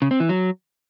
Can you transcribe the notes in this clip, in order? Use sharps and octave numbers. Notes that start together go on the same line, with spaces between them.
C#3
C4
E3
F#3